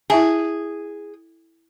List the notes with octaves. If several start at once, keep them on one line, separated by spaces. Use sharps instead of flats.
E4 G#4 E5 A5